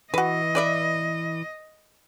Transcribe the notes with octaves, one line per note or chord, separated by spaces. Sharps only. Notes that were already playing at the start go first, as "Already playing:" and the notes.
E3 F#4 B4 D#5
B4 D5 E5